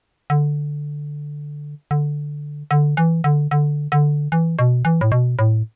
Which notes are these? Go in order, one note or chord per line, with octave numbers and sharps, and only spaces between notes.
D3
D3
D3
E3
D3
D3
D3
E3
B2
E3
A2
B2
A2